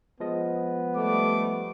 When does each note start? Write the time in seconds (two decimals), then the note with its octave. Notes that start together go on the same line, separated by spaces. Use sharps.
0.20 F3 G#3 B3 D#5
0.96 G3 A3 D6